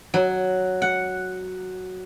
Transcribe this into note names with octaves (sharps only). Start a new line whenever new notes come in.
F#3
F#5